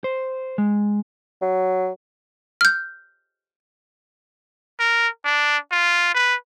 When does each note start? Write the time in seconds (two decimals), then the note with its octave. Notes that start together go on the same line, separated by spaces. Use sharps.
0.04 C5
0.58 G#3
1.42 F#3
2.61 F6 G6
4.79 A#4
5.24 D4
5.71 F4
6.14 B4